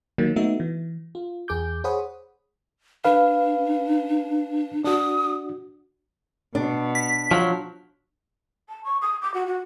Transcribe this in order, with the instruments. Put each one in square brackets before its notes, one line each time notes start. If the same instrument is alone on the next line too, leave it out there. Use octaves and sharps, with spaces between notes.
[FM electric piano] D#3 F#3 A#3
A3 B3 D#4 F#4 E5
E3
F4
E2 G#4 D6 G6
G#4 C5 C#5 F#5 B5 D#6
[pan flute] D4 [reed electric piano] B4 F5
[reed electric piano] D4 F#4 [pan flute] D#6
[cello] B2 [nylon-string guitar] D4
[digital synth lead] B6
[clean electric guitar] F3 F#3
[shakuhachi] A5
C#6
D#6
D6
F#4
F#4